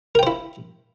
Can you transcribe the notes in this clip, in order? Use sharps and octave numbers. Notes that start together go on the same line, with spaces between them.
E4 A#4 C5 G5